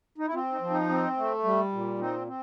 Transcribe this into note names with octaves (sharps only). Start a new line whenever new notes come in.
D#4
E4
C4 F4
D#4
F3
D#4
C4
A3
G3
A#2
C4 D#4
C4